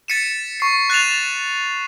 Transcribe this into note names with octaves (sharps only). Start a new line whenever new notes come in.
A6 B6 C#7 D#7 E7
C#6 C7
F#6 A6 C7 E7 F7